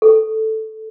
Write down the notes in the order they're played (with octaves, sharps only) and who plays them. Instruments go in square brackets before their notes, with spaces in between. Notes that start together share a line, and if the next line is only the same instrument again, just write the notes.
[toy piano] A4